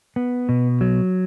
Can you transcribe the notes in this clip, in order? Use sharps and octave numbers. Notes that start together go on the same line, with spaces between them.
B3
B2
F#3